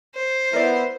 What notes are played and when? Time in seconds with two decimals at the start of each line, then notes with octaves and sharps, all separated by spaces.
0.15 C5
0.53 B3 E4 A#4 B4 D5 E5